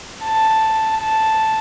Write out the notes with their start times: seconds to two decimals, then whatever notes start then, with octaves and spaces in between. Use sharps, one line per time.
0.25 A5
1.02 A5